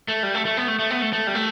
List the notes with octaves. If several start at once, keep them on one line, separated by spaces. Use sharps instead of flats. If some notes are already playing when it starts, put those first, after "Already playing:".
A3
G3
A3
A3
B3
A3
A3
B3
A3
A3
G3
A3